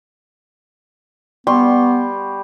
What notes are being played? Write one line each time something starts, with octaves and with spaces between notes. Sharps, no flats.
G3 B3 C6 C#6